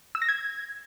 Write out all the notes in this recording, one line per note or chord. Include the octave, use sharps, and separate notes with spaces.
E6
A#6
G#6